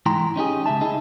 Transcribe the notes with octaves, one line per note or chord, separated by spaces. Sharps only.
G#2 E3 E4 G5 A#5 C6
C#4 D#4 G4 G#4
C#2 F#2 E5 A5
D#4 E4 G#4